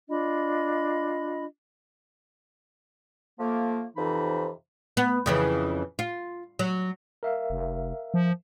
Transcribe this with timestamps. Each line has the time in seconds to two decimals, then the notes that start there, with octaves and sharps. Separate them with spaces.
0.09 D4 F4 D#5 B5
3.39 F3 A3 A#3
3.96 F2 C3 E3 D#4 B5
4.97 B3
5.26 F2 C#3 E3
5.99 F4
6.59 F#3
7.23 A#4 E5 F5
7.50 F1
8.14 F3